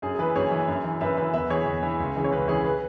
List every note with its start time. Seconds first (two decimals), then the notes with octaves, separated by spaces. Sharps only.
0.02 F#2 G#4
0.15 G#4
0.19 E3 B4
0.36 F#2 G#4 C#5
0.51 E3
0.68 F#2
0.84 E3
1.01 F#2 B4 E5
1.17 E3 B4 E5
1.34 E2 B4 E5
1.50 E3 G#4 C#5
1.66 E2
1.83 E3
2.00 C#2
2.16 C#3 E3
2.24 C#5
2.32 C#2 B4
2.48 C#3 E3 G#4 C#5
2.65 B4